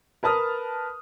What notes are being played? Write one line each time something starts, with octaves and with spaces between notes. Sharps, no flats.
A#4 B4 A5 D#6 F6